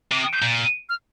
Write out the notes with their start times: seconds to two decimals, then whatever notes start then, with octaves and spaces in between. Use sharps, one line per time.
0.12 C3 D6
0.22 D#6
0.33 G6
0.42 A#2
0.89 F6